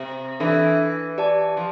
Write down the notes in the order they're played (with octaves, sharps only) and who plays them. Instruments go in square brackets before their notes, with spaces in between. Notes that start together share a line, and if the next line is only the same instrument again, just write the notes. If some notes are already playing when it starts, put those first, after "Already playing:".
Already playing: [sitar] C3
[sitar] E3 [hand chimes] D4 A4 E5
[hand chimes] G4 D5 A5
[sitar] F3